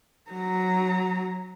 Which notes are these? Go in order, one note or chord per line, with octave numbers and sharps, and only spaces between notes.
F#3 A#5